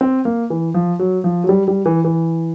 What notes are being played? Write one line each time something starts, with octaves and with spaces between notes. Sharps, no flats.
C4
A#3
E3
F3
F#3
F3
F#3
G3
G3
E3
E3